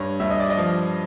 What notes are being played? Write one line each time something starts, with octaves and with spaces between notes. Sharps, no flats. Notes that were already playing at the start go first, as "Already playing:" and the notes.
Already playing: G2 C#5
G2 E5
D#5
D5
D#5
F3